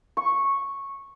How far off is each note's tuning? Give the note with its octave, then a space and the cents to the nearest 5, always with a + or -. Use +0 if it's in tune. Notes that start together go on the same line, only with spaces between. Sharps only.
C#6 -10